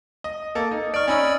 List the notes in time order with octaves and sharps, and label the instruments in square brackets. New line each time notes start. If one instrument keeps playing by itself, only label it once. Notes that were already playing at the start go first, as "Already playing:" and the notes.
[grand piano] D#5
A#3 A4
D#4
[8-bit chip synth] D5 C#6 [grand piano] F6 D7
[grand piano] C#4 D#4 D#5 [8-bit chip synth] D5 B5 E6